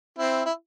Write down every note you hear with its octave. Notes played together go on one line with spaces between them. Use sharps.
C4 E4
E4